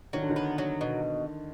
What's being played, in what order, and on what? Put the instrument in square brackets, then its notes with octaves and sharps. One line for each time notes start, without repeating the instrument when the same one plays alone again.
[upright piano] D#3 [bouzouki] F#3
[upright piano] D3
D#3
[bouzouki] B3
F#3
B2